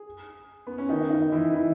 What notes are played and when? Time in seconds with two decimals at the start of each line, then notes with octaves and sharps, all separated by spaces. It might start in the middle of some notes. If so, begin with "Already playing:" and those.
Already playing: G#4
0.67 B3
0.78 C#4
0.89 D#3 D#4
1.10 D#3 D#4
1.32 E3 E4
1.52 E3 E4